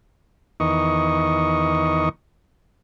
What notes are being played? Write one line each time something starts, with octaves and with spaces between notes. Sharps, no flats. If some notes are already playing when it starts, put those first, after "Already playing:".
E2 D#3 D#5 C#6